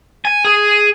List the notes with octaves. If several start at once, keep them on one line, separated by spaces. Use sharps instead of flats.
G#5
G#4